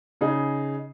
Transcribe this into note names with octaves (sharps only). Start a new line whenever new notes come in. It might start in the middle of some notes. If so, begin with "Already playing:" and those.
C#3 D#4 G#4